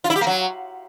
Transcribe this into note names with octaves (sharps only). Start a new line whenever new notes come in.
F4
E4
G4
A#3
F#3